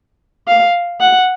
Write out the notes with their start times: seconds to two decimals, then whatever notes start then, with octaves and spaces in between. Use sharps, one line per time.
0.48 F5
1.00 F#5